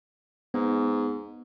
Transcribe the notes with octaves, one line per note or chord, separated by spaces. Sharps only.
G#2 B3